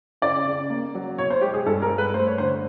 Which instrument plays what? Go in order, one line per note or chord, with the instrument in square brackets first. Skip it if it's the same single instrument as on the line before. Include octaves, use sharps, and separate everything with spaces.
[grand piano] C#3 [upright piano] D5
[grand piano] C#3
A#3
F#3
[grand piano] B2 [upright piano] C#5
[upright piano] C5
[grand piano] G#3 [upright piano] G4
[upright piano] G#4
[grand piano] G2 [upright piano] A4
[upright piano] A#4
[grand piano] G2
[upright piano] B4
[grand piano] A3 [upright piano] C5
[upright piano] C#5
[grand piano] D3 [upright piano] C5